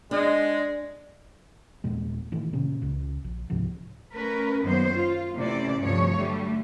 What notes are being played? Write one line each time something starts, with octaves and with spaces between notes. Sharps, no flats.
G#3 D4
D#1 B1 A#2 G#3
A2 D#3 E3
A#2 C#3 C#4
C#2 C#3
A#1
C#2 G#2 C3 F3
A3 C#4 A#4 B4
F#2 D#3 F#3 A#3 B3 C5
F4
A2 C3 E3 C#4 C5 D5
D2 G2 C3 F3 C#5
D3 G3 A3